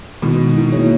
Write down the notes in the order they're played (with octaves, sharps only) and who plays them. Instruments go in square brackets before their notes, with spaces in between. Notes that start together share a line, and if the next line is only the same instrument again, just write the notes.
[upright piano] B2 [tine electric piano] D#3 G#3 D#4
[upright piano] D#3
[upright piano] E3 [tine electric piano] A#3 C#4 G#4 C#5